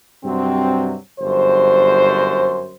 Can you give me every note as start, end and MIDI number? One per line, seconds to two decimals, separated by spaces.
0.24 0.95 43
0.24 0.95 48
0.24 0.95 54
0.24 0.95 60
1.20 2.75 31
1.20 2.75 42
1.20 2.75 72